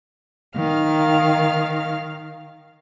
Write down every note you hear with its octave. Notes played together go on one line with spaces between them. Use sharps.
D#3 F5 F6